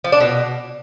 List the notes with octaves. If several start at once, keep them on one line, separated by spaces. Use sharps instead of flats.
F3
D4
B2